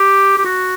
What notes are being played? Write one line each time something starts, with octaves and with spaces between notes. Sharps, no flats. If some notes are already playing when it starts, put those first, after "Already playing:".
Already playing: G4
G4
F#4